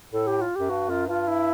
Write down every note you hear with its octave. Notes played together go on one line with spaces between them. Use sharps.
A2 A4
G4
F4
F#2 G4
G2 F#4
F#2 F4
G2 F4
E4